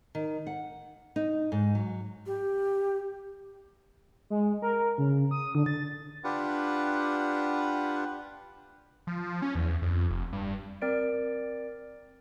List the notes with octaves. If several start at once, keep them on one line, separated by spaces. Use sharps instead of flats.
D#3
F#5
D#4
G#2
F#3
G4
G#3
A#4
C#3
D#6
D3
A6
D4 F4 G4 B4 F#5
F3
C#4
E2
F2
F1
G2
C4 A#4 D5 D7